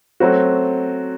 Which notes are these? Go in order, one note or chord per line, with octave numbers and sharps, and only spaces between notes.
F#3 A3 C4 F#4